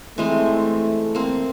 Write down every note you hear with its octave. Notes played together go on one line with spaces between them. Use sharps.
E3 G#3 A3 C4
A#3 C4